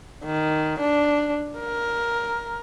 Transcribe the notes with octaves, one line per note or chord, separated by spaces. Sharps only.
D#3
D4
A#4